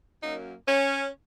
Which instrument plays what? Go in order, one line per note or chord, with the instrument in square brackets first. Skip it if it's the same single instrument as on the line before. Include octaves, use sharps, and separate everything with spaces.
[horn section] F#2 F#3 A#3 D#4
C#4